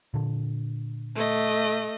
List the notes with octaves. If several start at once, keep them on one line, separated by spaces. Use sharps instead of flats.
A#2 D3
A3 D#5